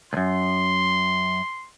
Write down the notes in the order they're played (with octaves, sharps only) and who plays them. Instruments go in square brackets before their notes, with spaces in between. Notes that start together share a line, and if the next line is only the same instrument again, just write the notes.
[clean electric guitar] C#2 F#2 [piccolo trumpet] C6